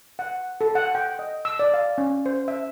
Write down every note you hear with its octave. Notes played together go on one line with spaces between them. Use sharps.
F#5
A4
F#5
G5
D#5
E6
D5
F5
C#4
C5
E5